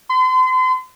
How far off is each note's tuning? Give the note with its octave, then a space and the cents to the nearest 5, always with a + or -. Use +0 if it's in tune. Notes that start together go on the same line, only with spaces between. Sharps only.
C6 -40